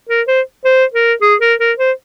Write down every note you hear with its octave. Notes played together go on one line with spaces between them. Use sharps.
A#4
C5
C5
A#4
G#4
A#4
A#4
C5